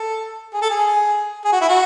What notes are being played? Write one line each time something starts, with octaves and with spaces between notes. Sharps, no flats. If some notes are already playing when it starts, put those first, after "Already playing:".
Already playing: A4
G#4
A4
G#4
G#4
F#4
E4
F#4